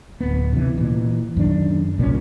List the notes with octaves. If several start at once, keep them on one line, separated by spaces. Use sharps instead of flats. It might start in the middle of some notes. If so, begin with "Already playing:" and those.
D1 B3
C3 E3
A#2 E3
F#2 D#3 D4
C2 A#2 A3 C#4